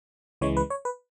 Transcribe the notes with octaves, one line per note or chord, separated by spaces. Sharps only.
C#2 C#3 E3 G#3 C#5
B4
C#5
B4